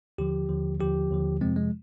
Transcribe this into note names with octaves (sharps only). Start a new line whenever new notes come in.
D#2 D3 F3 G4
D#2 D3 F3
D#2 D3 F3 G4
D#2 D3 F3
F2 C3 F3 G#3 C4
G#3